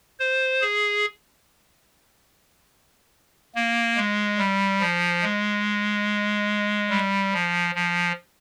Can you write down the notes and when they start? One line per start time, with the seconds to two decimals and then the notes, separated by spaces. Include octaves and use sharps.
0.20 C5
0.62 G#4
3.55 A#3
3.97 G#3
4.39 G3
4.80 F3
5.23 G#3
6.90 G3
7.33 F3
7.75 F3